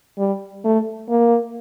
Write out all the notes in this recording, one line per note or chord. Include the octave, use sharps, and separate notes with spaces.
G3
A3
A#3